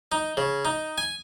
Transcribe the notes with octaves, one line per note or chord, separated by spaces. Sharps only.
D#4
C#3
D#4
G#5